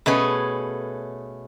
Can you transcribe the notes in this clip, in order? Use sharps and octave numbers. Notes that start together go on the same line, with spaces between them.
B2 A3 C#4 G#4 B4